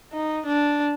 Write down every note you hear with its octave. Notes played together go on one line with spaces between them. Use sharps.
D#4
D4